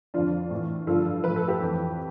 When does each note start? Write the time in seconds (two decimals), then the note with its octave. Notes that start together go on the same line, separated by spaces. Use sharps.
0.14 F2 D3 F3 D4 F4
0.51 A2 E3
0.87 G2 D3 F3 F4 A4
1.24 A2 F3 B4
1.36 A4
1.48 G4 B4
1.61 F2 E3